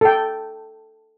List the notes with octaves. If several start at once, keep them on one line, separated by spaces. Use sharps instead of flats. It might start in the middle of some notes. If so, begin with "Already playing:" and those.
A4 G5